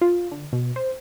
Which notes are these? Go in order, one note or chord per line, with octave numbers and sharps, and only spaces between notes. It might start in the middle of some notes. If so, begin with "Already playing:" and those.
F4
D3
B2
C5